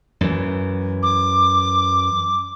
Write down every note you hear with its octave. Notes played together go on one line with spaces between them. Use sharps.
F#2 E3
D6